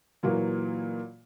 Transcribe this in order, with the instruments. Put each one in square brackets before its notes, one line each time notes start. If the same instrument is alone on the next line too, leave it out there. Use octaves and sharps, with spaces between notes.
[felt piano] A#2 E3 F#3 A#3